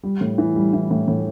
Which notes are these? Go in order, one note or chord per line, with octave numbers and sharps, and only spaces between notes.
G3
A2
E3
G3
E3
A2
A2